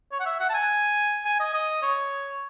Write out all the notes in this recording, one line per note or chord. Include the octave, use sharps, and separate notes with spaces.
C#5
F#5
E5
F#5
A5
G#5
G#5
D#5
D#5
C#5